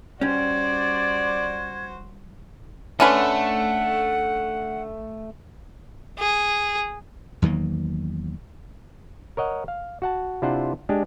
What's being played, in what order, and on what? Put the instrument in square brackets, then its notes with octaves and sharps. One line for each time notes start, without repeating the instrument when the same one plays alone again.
[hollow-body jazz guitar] G3 C#4 [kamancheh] F#4 C5 [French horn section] D5 [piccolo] G#6
[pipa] D3 C#4 B4 [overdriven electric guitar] A3 [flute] F#5
[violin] G#4
[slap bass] E2 D#3 F#3 A#3
[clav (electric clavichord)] A#4 C#5 D#5 F#5
F5
F#4 F#5 A5
C3 D4 E4 F4 C5 F#5
G#3 D4 G4